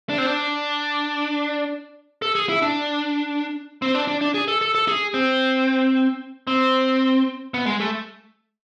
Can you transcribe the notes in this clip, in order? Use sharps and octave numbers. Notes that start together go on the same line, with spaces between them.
D4
C4
D4
A4
G#4
E4
D4
C4
D4
D4
D4
G#4
A4
A4
A4
G#4
C4
C4
B3
G#3
A3